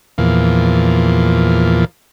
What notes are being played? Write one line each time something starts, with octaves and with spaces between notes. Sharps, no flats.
E2 A#2 F3